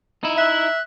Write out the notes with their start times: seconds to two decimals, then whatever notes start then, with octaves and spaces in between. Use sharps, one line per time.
0.23 D#4 E4
0.38 E5 F#6